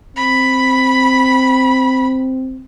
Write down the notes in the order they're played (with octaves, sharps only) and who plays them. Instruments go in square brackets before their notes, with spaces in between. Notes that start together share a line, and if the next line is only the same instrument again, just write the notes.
[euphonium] C4 [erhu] B5